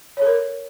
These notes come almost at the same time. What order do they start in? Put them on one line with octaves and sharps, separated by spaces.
C#5 A4 A#4